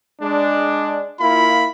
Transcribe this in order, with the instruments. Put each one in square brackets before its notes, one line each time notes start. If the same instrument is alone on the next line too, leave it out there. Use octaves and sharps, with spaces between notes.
[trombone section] G#3 D4
[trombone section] A#3 E4 F4 [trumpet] B5